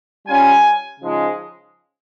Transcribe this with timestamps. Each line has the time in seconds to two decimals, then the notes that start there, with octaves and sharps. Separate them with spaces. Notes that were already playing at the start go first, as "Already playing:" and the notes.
0.27 G3 C#4 F4 G#5
1.00 C#3 F3 G#3 D#4